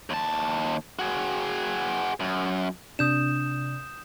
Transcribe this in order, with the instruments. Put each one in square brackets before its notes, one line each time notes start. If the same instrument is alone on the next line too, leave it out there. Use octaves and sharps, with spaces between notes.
[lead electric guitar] D#2 A5
F#4 G#4
F#2
[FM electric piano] C3 D4 [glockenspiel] D#6 G6 E7